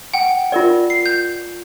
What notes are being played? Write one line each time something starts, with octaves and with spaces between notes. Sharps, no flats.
F#5 G5
F4 A#4 D5
C7
G6